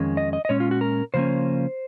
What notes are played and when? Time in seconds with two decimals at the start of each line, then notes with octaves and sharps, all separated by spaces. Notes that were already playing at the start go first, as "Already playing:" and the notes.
Already playing: F2 D#3 G#3 C#4
0.17 D#5
0.33 D#5
0.45 D#5
0.49 A#2 G#3 C#4 C#5
0.60 F4
0.71 F#4
0.81 A#4
1.14 C#3 F3 A#3 C#4 C5